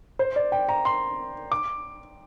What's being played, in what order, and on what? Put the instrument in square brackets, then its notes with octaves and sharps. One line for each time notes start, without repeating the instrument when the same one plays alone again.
[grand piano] C5
D5
G5
A#5
C6
D6